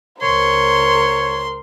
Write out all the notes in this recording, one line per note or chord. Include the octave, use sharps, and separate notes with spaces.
C#2 A#4 C5 C#5 C6